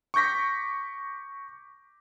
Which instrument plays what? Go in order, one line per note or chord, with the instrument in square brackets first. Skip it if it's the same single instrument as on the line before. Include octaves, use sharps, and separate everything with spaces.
[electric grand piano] C#6 D6 G6 A#6 B6